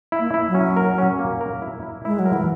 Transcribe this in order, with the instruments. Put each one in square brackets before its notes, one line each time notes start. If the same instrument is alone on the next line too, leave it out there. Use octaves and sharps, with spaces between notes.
[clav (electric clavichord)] E4
[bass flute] A#3
[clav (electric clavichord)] E4
[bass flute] F#3
[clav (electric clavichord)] C#4
A#4
C#4
A#3
A#4
E4
E4
[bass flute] G#3 [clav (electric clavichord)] E4
[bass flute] F#3
[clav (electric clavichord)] A#4
[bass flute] E3